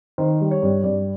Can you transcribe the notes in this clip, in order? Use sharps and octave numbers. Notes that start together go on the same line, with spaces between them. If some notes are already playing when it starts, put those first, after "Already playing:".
D#3 C5
G3
C#5
G2
G2 D5